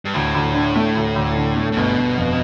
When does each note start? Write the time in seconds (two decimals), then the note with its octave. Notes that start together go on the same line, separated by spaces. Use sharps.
0.05 G2
0.14 D2 A2
0.34 D2
0.54 D3
0.76 A3
0.95 D2
1.16 D2
1.36 D3
1.56 A3
1.72 A2
1.77 G1 B2
1.98 G1
2.17 F2